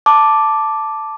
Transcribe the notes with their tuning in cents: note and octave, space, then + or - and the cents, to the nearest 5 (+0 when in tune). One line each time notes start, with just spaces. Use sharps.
A5 +0 D6 +0